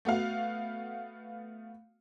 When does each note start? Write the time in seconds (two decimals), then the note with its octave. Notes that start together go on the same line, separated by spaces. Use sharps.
0.05 A3 B3 F#4 F5